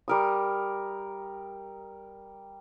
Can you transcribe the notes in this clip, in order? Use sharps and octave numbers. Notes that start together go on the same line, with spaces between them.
G3 A#4 D#6